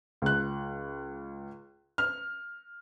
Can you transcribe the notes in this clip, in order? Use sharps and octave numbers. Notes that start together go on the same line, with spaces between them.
C#2 F#6
F6